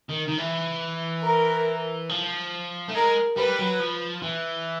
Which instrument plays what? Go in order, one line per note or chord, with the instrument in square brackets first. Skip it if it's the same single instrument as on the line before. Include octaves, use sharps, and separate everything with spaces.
[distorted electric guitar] D#3
D#3
E3
[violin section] A#4
[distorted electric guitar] F3
A3
[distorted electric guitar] G#3 [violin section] A#4
[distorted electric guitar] G3 [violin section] B4
[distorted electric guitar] F#3
F3
E3